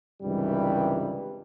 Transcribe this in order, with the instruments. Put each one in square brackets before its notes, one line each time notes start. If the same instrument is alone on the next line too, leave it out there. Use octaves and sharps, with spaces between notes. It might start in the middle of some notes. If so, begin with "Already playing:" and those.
[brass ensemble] C#2 G2 C3 D#3 E3 G3